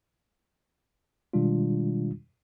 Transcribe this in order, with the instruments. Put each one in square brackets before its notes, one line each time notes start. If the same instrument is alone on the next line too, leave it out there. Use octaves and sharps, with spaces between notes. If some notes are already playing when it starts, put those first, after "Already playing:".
[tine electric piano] B2 D#3 G3 G#3 D4 F4